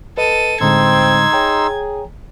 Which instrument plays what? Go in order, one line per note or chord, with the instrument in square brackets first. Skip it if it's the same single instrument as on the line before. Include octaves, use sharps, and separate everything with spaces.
[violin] A4 D#7 [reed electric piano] B4 D#5
[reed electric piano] A2 D3 G#3 [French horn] C4 [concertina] D#4 C6 E6 [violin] G#6
[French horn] G#4 [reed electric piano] C#5 G5 A#5